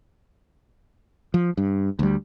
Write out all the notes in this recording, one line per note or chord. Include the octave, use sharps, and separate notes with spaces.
F3
G2
D2 G3